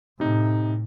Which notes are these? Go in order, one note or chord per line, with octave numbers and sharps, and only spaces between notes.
A2 C3 D#4